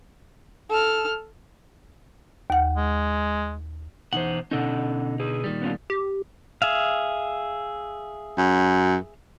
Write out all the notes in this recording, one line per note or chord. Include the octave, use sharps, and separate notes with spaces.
A4 F6
D#2 F#5
G#3
E2 B2 D#4 C5 F#5
B2 D3 C#4 D#4 A4 F#5
G#4 B4
A#2 D#3 G3
B3 C#4 F4
G4
G#4 E5 F5
F#2